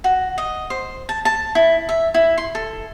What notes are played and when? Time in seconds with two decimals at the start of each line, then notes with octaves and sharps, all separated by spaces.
0.04 F#4
0.38 D#5
0.70 C5
1.09 A5
1.25 A5
1.55 E4
1.89 E5
2.14 E4
2.38 C6
2.55 A4